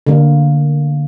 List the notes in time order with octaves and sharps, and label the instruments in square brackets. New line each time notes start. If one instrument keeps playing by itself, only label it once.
[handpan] D3 A#3